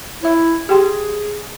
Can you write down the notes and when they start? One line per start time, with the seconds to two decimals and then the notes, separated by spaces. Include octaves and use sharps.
0.23 E4 C#5 E5
0.69 G4 G#4 G5 C6